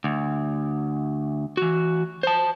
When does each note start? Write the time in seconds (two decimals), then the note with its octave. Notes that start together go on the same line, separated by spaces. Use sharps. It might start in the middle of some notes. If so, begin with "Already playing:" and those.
0.04 D2
1.57 E3 F#4
2.23 C5 A5